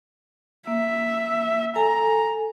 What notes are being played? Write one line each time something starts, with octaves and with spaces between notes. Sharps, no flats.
A#3 E5
A4 G#5 A#5